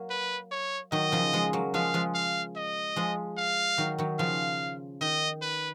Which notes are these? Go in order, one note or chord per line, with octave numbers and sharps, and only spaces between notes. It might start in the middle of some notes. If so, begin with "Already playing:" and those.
Already playing: F#3 A#3
B4
C#5
D#3 F#3 D#5
C#3 F3
F3 G#3
F#3 A#3
F3 G#3 F5
F3 G#3
F5
D#5
F3 G#3
F5
D#3 F#3
D#3 F#3
C#3 F3 F5
D#3 D#5
B4